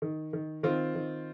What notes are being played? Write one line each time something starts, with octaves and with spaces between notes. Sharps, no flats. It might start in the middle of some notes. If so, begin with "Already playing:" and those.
D#3
D#3
D#3 C4 F4
D#3